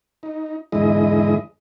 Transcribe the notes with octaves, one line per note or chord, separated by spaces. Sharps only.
D#4
E2 G#2 D3 G#3 E4 D#5